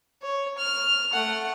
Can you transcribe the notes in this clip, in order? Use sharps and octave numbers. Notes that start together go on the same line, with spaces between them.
C#5
F6
A3 F#5